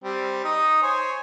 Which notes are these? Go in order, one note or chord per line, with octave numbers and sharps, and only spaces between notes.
G3 C4
D#4 D#6
C5 C#5 G#5